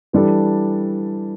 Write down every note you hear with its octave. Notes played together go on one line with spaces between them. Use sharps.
E3 G3 D4 A4